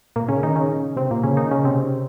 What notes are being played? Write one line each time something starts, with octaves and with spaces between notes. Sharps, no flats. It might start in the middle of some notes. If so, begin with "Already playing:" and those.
A#2 A#3
C#3 C#4
D#3 D#4
C#3 C#4
C3 C4
A#2 A#3
C#3 C#4
D#3 D#4
C#3 C#4
C3 C4